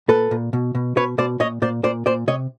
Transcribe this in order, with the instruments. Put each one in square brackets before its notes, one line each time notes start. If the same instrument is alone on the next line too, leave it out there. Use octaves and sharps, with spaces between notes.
[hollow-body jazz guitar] A#2 A4 B4
A#2
B2
B2
B2 B4 C#5
B2 C5 D5
A#2 C#5 D#5
A#2 C5 D5
A#2 C5 D5
A#2 C5 D5
C3 C#5 D#5